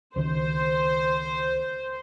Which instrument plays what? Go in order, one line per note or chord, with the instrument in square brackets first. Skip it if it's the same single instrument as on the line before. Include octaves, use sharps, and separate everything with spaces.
[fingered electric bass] C#2 D#3 [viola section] C5